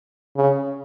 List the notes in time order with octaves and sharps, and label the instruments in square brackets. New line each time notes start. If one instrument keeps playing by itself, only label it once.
[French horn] C#3